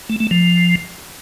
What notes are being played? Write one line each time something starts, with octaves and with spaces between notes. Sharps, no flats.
A3
A3
F3